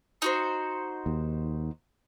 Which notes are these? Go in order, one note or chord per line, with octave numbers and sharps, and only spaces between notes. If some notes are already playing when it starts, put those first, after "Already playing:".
D#4 F#4 C5
D#2